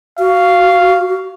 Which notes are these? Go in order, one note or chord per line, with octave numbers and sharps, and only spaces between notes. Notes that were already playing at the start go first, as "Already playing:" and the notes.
F#4 F5